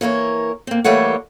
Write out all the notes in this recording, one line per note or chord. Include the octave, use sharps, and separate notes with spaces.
E3 A#3 A#4 C#5
A#3 C4
E3 G3 A3 A#3 C#5 F#5